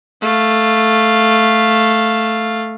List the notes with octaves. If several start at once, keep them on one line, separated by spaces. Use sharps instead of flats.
A3 F5